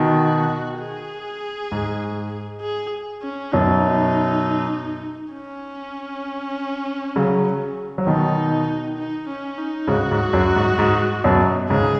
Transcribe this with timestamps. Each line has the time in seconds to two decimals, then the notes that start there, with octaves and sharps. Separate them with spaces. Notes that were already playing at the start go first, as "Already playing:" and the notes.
Already playing: B2 D#3 F#4
0.80 G#4
1.72 G#2
2.61 G#4
3.23 C#4
3.52 F#2 B2 D#4
5.34 C#4
7.16 C#3 F#3
7.98 F#3
8.06 B2 D#3 D#4
8.98 D#4
9.28 C#4
9.58 D#4
9.88 G#2 C#3 F#4
10.11 G#2
10.33 F#2
10.56 G#2
10.79 G#2
11.24 F#2 B2
11.69 G#2 C#3 G#4